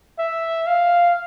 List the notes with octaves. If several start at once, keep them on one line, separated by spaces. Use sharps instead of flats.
E5
F5